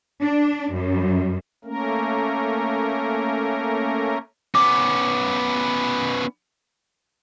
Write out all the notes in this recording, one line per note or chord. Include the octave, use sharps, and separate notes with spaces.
D4
F#2
A3 A#3 C#4 A#4
B3 C#4 D6